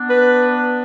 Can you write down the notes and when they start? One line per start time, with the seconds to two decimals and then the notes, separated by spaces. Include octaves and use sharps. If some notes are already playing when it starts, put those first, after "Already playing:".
Already playing: B3 D4
0.10 B4